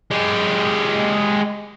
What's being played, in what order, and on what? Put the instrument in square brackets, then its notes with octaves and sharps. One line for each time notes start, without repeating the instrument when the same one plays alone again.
[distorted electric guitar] G#3 G4